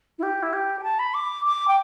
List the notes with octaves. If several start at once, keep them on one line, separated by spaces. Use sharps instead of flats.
E4
G4
E4
G4
G5
A5
B5
D6
D6
G5